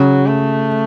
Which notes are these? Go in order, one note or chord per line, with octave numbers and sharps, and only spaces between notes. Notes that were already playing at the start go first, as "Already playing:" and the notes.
Already playing: C#3 F#3
A3